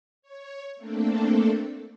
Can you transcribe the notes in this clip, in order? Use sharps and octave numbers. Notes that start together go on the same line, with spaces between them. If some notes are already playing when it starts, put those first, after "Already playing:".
C#5
A3 A#3 C4 D4 A4